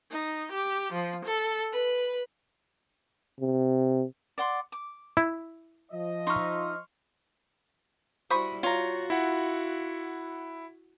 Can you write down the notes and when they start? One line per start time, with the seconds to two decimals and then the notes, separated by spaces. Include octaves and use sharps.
0.10 D#4
0.50 G4
0.92 F3
1.24 A4
1.73 B4
3.41 C3
4.38 D5 F#5 C6
4.72 D6
5.17 E4
5.92 F3 D#5
6.27 D#4 E5 C6 C#6 F6
8.30 G3 E4 F#4 C5 B5 C#6 D#6
8.63 F4 F#4 C#5 A#5
9.10 E4 F#5